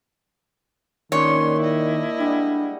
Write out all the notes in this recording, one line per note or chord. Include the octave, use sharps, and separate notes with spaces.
A#2 D#3 G#3 C#4 D4 C#5 C6
E4 D#5
G3 G#3 D4 F#5